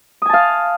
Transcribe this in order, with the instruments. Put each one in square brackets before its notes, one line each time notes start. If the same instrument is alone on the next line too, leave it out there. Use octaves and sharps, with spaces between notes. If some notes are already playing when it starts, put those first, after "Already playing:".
[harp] D#6
G#5
A5
F5